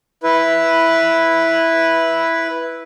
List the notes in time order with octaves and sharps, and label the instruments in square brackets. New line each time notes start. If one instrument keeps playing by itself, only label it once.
[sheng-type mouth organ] E4 B4